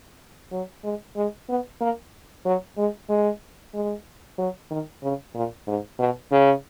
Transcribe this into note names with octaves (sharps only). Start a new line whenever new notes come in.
F#3
G#3
G#3
B3
A#3
F#3
G#3
G#3
G#3
F#3
D#3
C#3
A#2
G#2
B2
C#3